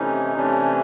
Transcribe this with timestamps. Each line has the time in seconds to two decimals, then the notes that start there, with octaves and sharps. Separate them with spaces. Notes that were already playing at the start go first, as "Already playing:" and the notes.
Already playing: C3 E3 A3 C#4 D#4
0.36 C3 E3 A3 C#4 D4